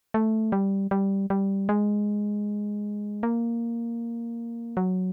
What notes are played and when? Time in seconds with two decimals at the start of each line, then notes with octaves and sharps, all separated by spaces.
0.14 A3
0.52 G3
0.91 G3
1.30 G3
1.69 G#3
3.23 A#3
4.77 F#3